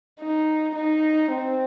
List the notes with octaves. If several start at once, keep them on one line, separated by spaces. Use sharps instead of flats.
D#4
D#4
C4